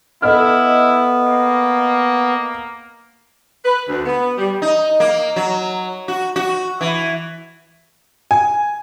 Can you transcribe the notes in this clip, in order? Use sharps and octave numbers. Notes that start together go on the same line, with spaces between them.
B3 E4 A4 D#5 F6
A#3
B4
D2
B3
G3
D#4
A#3
F#3
F#4
F#4
E3
G#5